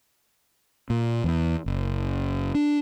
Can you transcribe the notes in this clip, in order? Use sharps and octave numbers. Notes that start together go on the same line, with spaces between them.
A#2
E2
F#1
D4